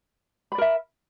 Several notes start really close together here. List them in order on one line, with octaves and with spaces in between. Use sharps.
B5 D5 A#4 E5